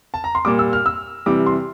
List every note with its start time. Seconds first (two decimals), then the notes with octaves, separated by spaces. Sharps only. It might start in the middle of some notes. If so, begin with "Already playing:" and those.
0.14 A5
0.24 A#5
0.35 C6
0.45 A#2 G3 D6
0.59 E6
0.73 F6
0.86 E6
1.26 C3 E3 G3 D6
1.46 C6